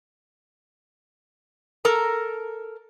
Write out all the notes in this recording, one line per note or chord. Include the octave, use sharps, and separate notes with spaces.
A4 A#4 A#5